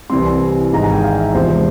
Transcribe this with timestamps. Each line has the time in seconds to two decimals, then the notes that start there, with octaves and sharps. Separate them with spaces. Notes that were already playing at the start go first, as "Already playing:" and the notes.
0.10 C2 C3 E3 G3 C4 C6
0.25 G#5
0.73 G#1 G#2 E3 G#3 A#5
0.83 G#5
0.94 G5
1.03 F5
1.19 E5
1.34 E2 C3 F3 G#3 C5